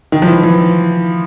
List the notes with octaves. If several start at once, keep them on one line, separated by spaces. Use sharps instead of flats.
D#3
F3
E3
E3